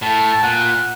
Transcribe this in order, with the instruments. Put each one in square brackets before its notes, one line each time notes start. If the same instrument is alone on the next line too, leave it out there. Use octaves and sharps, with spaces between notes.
[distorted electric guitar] A2 [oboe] A5
[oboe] A5
[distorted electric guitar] A#2 [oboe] F#5